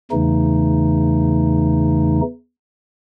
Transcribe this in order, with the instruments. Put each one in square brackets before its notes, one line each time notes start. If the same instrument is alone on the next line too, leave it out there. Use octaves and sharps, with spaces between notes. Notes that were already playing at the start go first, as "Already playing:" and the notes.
[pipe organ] E2 C#3 E3 A3 D#4